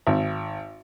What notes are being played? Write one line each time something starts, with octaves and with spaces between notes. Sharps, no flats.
G#1